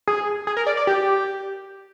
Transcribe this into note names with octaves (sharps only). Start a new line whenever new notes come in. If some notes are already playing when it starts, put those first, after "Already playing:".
G#4
G#4
A#4
D5
D5
G4